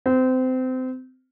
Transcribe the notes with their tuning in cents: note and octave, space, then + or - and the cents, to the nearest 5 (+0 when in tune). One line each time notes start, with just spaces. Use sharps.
C4 -25